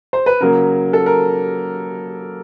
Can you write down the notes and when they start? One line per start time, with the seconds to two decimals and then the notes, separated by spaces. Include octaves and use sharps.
0.13 C5
0.26 B4
0.41 C#3 F#3 A#3 A#4
0.93 A4
1.06 A#4